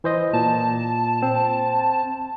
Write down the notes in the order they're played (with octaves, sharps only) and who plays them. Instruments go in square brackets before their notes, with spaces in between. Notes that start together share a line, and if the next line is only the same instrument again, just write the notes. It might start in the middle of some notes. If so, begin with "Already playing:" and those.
[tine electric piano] E3 C5 D#5
[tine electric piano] A#2 [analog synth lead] A5
[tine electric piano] C4